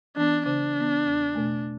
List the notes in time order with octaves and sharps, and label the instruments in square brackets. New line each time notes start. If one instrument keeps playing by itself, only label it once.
[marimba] E3 B3 [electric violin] D4
[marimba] C#3 [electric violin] D4
[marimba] E3 B3
E2
B2 A3